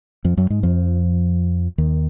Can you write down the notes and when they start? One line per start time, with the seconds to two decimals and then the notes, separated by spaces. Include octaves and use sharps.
0.24 F2 F3
0.37 F#2 F#3
0.50 G#2 G#3
0.63 F2 F3
1.78 D#2 D#3